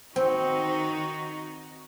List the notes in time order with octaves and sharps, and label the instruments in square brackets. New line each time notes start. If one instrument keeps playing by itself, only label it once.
[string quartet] D#3 D#4 F#4 [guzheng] C4